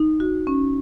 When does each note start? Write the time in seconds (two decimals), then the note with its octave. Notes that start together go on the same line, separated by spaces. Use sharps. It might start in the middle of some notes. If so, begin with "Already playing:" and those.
Already playing: D#4
0.20 F#4
0.47 C#4